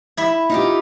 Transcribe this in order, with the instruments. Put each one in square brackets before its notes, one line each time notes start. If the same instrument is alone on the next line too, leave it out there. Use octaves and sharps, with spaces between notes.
[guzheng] E4 E5
[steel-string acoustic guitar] D#4 F4 G4